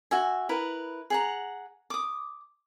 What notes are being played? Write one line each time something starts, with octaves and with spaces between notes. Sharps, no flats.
F#4 E5 G#5
E4 A#4 B4
G#4 F#5 A#5
D6 D#6